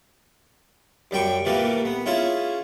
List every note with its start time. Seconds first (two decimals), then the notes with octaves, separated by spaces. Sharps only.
1.11 F#2 G3 G5 C#6
1.45 A#2 E3 G3 A3 A#3
1.85 B3
2.06 C#4 E4 F4 G#4